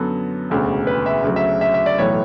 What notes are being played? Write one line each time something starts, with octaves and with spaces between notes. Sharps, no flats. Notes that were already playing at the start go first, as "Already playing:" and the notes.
Already playing: F#2 D3 F#3 B3 A4
E1 D2 C#3
B4
E5
D2 C#3 F#3
E5
E5
E5
D5
B1 A2 E3 B3 C#5